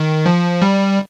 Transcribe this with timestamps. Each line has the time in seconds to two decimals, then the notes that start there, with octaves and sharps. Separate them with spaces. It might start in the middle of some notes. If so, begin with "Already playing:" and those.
Already playing: D#3
0.26 F3
0.62 G3